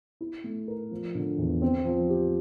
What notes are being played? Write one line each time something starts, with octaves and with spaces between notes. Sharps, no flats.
E4
A3
A#4
F3
D3
E2
C4
F3
G4